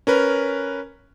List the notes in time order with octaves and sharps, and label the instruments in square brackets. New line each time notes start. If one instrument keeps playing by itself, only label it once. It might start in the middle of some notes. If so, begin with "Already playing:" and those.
[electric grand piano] C#4 A#4 B4